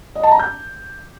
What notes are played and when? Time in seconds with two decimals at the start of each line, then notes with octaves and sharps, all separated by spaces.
0.15 D#5
0.23 A5
0.31 A#5
0.39 G6